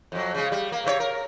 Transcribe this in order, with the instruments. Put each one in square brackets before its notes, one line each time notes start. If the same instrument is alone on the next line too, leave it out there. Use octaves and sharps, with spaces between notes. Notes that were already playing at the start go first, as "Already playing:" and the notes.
[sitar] F2 F#3
C#3 G#3
G3
A#3
C3 D#3 C#5
A#4